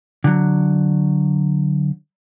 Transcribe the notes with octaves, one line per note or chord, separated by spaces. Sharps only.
D3 F#3